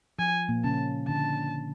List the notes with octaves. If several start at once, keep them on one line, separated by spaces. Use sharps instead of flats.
F3 G#5
A#2 A#3
C#3 C#4 A5
D3 D4 A5